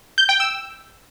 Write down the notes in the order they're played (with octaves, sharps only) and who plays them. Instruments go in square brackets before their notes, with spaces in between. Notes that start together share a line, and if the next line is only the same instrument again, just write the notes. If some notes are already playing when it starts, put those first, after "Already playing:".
[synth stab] G6
G5
E6